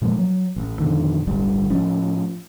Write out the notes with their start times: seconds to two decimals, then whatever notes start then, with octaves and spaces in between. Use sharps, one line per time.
0.02 A#2 F3 G#3 A#3
0.19 F#3
0.56 A1
0.79 F2 B2 D3 D#3
1.27 D1 G1 D2 G3
1.69 A2 F3 C#4